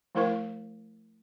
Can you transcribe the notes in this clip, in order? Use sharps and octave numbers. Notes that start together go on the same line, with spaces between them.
F3 A3 E4 A#4 C5 C#6